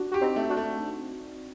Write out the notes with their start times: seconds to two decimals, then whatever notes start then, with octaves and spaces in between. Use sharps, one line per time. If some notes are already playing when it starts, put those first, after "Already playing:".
Already playing: D4 F#4
0.12 F#4 G4
0.21 C4 D#4
0.36 A3
0.50 D4 F#4
0.57 A3